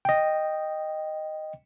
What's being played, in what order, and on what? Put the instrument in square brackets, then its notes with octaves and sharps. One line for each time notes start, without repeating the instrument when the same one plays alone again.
[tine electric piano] D#5 G5